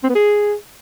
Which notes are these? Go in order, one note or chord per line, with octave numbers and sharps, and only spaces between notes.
C4
B3
G#4